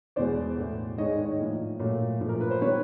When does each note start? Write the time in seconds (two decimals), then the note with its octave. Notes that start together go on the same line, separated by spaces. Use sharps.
0.16 E2 B2 G#3 C5 D5
0.58 A2 E3 A3
0.98 G#2 D#3 G#3 C#5 D#5
1.25 C#5 D#5
1.39 A2 F3 A#3
1.79 A#2 F#3 A3
2.20 A#2 F3 A3
2.29 A#4
2.40 B4
2.50 C5
2.61 D#3 G3 B3 B4 C#5